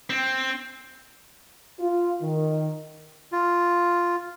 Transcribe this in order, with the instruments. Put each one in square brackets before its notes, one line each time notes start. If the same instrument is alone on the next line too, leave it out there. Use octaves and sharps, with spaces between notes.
[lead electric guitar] C4
[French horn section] F4
D#3
[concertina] F4